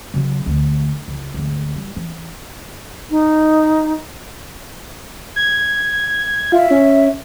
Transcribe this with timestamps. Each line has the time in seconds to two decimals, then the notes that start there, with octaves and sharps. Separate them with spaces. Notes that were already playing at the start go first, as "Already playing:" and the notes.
0.14 C#3 F#3
0.46 D2
1.08 C#2
1.34 D2 G#2
1.76 G3
1.96 E3
3.11 D#4
5.36 G#6
6.52 F4 E5
6.70 C#4